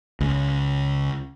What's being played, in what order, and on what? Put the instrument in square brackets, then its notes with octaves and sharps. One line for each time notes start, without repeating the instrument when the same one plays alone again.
[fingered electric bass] C#2